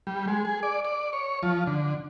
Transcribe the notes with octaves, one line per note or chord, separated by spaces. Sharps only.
G3
G#3
G#4
D5
D5
C#5
F3
D3